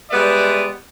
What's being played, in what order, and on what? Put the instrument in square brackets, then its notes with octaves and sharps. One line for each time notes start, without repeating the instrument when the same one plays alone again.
[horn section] G3 G#3 B3 B4 D5 E5